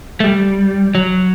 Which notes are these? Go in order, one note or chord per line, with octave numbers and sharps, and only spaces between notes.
A3
G3
F#3